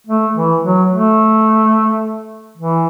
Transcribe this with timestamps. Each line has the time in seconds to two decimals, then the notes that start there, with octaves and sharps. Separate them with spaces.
0.07 A3
0.35 E3
0.63 F#3
0.91 A3
2.57 E3